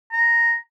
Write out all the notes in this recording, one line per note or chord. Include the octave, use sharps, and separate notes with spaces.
A#5